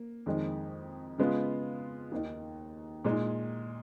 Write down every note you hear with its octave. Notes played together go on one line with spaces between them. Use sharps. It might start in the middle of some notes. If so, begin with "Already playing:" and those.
Already playing: A#3
F2 D#3 G#3 D#4
C#3 G#3 B3 F4
D#2 D#3 A#3 D#4
A#2 G#3 D#4